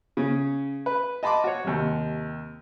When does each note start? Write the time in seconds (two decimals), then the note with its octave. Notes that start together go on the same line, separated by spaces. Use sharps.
0.17 C#3 C#4
0.86 B4
1.23 D#5 A5 B5 C6 D6
1.44 F#4 C#5
1.64 D#2 C3